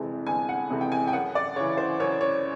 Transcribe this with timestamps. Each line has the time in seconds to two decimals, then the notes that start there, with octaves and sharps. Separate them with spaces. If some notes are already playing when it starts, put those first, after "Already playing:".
Already playing: G1 F2 C3 E3 G#3
0.27 G1 G#5
0.49 F#5
0.70 F2 C3 E3 G#3
0.81 G5
0.92 G#5
1.08 G5
1.13 F#2 F#5
1.35 D5
1.56 C#3 E3 C#5
1.77 C5
2.00 F#2 C#5
2.21 C#5